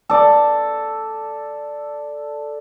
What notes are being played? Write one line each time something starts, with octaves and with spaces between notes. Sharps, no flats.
A4 D5